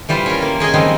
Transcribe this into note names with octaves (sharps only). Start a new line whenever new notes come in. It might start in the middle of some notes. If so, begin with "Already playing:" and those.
E3 G3 F4 C5
C#4 A#4
A#3
C#4 G#4 D#5 G#5
D#3 F3 G3 G#3 C4